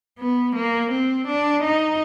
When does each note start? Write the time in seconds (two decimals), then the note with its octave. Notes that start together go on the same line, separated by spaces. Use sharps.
0.19 B3
0.56 A#3
0.91 C4
1.27 D4
1.63 D#4